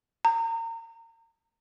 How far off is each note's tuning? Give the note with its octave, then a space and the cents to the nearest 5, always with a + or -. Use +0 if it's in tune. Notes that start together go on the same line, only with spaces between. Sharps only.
A#5 -30